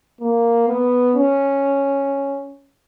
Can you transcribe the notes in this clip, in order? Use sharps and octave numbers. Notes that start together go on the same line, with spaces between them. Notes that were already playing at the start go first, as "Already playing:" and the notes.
A#3
B3
C#4